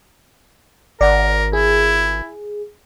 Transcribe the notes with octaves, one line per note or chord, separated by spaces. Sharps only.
G#1 A#4 D5 F#5
E4 G#4